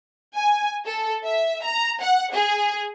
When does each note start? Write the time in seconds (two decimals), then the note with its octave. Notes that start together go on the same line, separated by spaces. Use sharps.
0.35 G#5
0.87 A4
1.25 E5
1.64 A#5
2.02 F#5
2.34 G#4